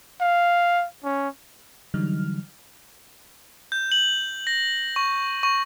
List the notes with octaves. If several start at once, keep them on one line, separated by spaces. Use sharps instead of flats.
F5
C#4
D3 E3 F#3 G3 D#4 F6
G6
F#7
A#6
C#6
C#6